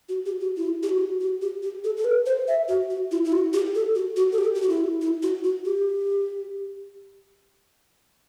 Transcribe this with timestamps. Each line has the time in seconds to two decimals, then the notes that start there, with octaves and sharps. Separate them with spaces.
0.09 F#4
0.26 G4
0.41 F#4
0.57 E4
0.83 G4
0.89 F#4
1.21 F#4
1.42 G4
1.63 G4
1.84 A4
1.97 A4
2.05 B4
2.26 C5
2.48 E5
2.68 F#4
2.90 F#4
3.12 E4
3.25 E4
3.32 F#4
3.53 G4
3.75 A4
3.95 F#4
4.17 F#4
4.32 A4
4.38 G4
4.55 G4
4.62 F#4
4.69 E4
5.02 E4
5.23 F#4
5.44 F#4
5.65 G4